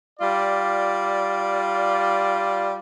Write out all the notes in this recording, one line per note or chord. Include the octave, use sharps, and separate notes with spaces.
G3 F4 D5